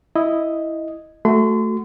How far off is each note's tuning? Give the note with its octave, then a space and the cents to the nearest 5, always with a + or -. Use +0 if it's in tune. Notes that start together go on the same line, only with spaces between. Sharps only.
E4 -5 D#5 +0
A3 +0 F#4 +0 C6 -35